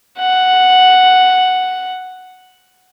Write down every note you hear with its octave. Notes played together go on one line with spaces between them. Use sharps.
F#5